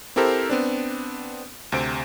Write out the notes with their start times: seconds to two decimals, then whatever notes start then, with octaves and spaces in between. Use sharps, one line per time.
0.16 C4 E4 G4 A4 A#4 C5
0.50 B3 C4 D4
1.72 D2 C3 C5 D7